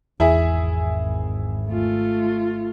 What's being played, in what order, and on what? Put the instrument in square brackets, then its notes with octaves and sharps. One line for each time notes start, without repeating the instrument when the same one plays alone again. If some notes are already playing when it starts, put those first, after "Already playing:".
[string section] G#1 [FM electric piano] E2 [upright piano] E4 G#4 E5
[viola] A3 F4